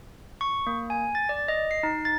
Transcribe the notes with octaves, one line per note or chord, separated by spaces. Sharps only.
C#6
A#3
G#5
A6
D5
D#5
C7
D#4
A6